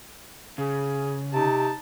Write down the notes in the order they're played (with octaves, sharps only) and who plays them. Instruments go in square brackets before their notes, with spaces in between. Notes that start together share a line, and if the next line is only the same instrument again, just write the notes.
[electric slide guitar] C#3 [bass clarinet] G#4
[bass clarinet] C3 [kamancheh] D#4 A5